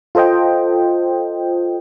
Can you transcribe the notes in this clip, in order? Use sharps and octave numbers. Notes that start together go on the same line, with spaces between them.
F4 A4 C5 D#5 G5